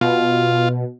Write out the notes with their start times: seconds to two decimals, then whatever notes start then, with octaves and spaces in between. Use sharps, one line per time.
0.01 B2 F4